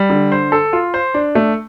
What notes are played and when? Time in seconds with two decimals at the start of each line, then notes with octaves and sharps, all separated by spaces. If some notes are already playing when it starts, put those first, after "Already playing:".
Already playing: G3
0.10 D3
0.32 C5
0.52 A4
0.73 F4
0.94 C5
1.14 D4
1.35 A3